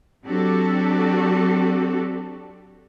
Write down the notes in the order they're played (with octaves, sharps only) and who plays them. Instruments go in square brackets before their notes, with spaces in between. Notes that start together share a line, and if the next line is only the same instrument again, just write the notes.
[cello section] F#3 C4 D4 F#4 G4 A4